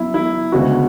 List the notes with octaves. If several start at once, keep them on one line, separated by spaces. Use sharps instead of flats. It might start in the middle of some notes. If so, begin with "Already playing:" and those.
Already playing: F#2 B3 E4
E4
D2 C#3 G#3 B3 F#4